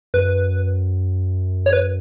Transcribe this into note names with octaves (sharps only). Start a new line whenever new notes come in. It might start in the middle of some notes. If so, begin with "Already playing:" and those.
F#2 B4
C#5
B4